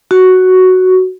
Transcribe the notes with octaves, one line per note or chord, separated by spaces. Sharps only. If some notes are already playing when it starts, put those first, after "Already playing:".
F#4